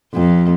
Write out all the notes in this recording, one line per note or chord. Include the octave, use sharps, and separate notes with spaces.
F2